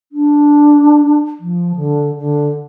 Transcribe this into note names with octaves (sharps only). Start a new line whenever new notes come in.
D4
F3
D3
D3